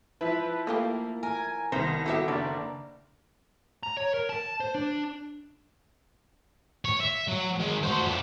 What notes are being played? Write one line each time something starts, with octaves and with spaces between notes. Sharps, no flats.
F3 E4 B4
A3 A#3 F4 G4
A#4 G#5
C2 D#3 B3 C5 A#6
B3 E4 F#4 G4 A4 E5
F#1 D4 A#4 D5
A#5
C#5
A#4
A5
C5
D4
C#5
E5
F#3
D#3 G#3
F#4 C5
F2 D4